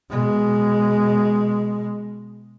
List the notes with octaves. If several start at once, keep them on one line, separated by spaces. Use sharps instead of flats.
B2 G#3